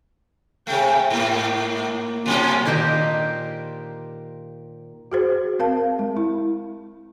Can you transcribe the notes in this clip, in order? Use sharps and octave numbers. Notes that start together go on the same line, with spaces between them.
C3 A3 G5
G#2 A#3
B2 F#3 C#4 F4 A5
A#2 D#3 G4 C5 A#5
F#4 G#4 C5
C4 A#4 F5 A5
G#3
E4